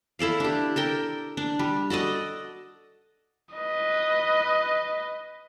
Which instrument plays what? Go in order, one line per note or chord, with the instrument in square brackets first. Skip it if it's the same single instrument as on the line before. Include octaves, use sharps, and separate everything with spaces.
[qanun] E4 A4 D5 F5
D4 G4
A4 A#4 G5
D4
G3
F#4 A4 D5 D#5
[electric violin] B4 D#5